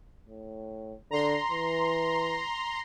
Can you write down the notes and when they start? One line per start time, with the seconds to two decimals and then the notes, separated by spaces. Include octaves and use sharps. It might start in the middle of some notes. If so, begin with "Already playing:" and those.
0.26 A2
1.11 D3 A#5 C6
1.51 E3